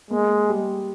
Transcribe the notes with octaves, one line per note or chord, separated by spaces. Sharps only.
G#3 A#3
G3